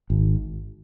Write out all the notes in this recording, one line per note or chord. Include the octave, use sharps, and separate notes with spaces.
G#1